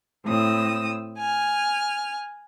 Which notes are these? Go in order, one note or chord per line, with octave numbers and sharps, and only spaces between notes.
A2 C4 D#6 E6
G#5 F6